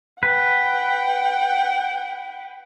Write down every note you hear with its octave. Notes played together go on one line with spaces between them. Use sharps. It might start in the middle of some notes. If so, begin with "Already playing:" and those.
B4 F#5 G5